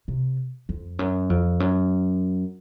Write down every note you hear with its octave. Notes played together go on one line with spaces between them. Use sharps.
C3
F2
F#2
F2
F#2